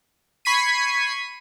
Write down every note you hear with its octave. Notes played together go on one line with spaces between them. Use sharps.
B5 C#6 G#6 B6 C7 D#7